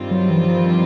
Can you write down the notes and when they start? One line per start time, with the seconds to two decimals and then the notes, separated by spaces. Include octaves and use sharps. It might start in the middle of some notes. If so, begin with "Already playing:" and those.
Already playing: G2 D#3 G3 C4 F4
0.11 F#3
0.30 E3
0.40 F3